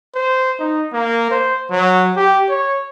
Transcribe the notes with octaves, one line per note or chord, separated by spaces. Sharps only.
C5
D#4
A#3
C5
F#3
G4
C#5